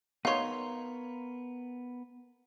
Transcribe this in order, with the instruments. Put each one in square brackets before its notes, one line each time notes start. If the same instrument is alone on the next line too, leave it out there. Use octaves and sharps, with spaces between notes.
[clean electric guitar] B3 A#4 [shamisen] D#4 C#5 [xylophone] F5 C6